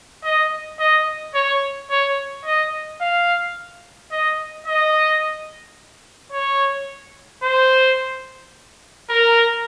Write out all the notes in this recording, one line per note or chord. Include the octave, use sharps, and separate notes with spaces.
D#5
D#5
C#5
C#5
D#5
F5
D#5
D#5
C#5
C5
A#4